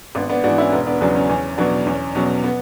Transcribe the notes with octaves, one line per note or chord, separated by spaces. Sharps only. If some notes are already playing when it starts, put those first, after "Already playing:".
G#1 B3 D4
B3 D4
G#2 E3 D4 F#4
C#4 E4
E1 B3 D4
B3 D4
E2 C#3 F#3 B3 D4
C#4
E2 C#4
B2 F#3 B3 D4
E2 C#4
B2 F#3 C#4
B3